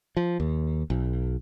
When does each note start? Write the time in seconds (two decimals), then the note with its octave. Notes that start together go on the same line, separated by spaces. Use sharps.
0.17 F3
0.40 D#2
0.90 B1